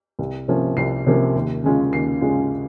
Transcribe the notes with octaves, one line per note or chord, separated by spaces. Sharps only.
C2
C3 F3 A#3 C#4
C2 C7
C3 F3 A#3 C#4
D#2
C#3 G#3 C#4 F4
D#2 C7
C#3 G#3 C#4 F4